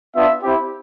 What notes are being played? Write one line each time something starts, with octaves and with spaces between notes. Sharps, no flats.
B3 D4 F4 E5
C4 E4 G4